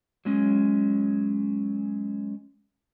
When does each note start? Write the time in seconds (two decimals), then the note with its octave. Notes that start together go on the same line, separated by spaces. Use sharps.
0.25 F#3 G#3 C#4